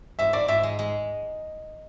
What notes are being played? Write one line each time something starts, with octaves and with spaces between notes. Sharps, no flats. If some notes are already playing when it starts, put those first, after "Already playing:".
G#2 E5
G#2 D5
G#2 E5
G#3
G#3